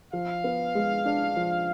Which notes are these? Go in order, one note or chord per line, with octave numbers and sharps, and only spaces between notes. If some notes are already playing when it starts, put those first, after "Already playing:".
F3 F5
B3
G#3
D4
F3